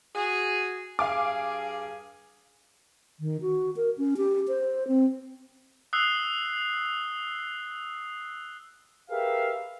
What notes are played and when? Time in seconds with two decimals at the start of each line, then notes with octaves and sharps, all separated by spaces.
0.15 F#4 G#4
0.99 G2 G#4 F5 G#5 D6
3.20 D#3
3.41 F#4
3.76 A#4
3.98 C#4
4.17 G4
4.48 C5
4.88 C4
5.93 D#6 E6 F#6 C7 G7
9.10 G4 G#4 A#4 B4 E5 F5